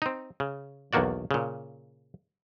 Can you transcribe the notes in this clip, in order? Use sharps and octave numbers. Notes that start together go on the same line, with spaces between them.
C4 D#4
C#3
B1 E2 D#3 A#3 F#4 D5
A#2 C#3